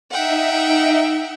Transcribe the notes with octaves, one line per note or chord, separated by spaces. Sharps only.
D#4 E5 F#5 G5